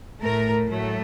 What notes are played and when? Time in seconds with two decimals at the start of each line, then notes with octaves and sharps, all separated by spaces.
0.22 A2 A3 A#4
0.70 A2 F#3 A3